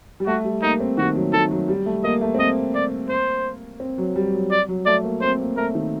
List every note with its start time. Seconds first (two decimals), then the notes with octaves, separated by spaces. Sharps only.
0.20 G3
0.27 A3 F#4
0.45 G3
0.62 A#3 D#4
0.80 C4
0.98 D#3 F#4
1.15 F#3
1.33 D#3 A4
1.51 F#3
1.68 G3
1.86 A3
2.04 A#3 D#5
2.21 A3
2.35 C4
2.39 A#3 D#5
2.75 D5
3.10 C5
3.80 C4
3.98 F#3
4.16 G3
4.33 F#3
4.51 D5
4.68 F#3
4.86 A3 D5
5.04 A#3
5.21 C4 C5
5.39 A#3
5.57 A3 A#4
5.75 D#3